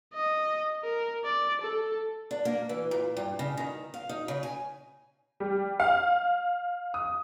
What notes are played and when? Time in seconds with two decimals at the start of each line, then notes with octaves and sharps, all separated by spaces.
0.14 D#5
0.84 A#4
1.25 D5
1.61 A4
2.31 D4
2.45 A#3
2.69 E3
2.91 A#2
3.17 G2
3.39 C#3
3.57 D#3
3.94 F5
4.09 D#4
4.28 C#3
4.43 G#5
5.40 G3
5.80 F5
6.94 D#6